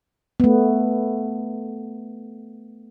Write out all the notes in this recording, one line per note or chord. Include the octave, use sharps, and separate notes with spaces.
A3 B3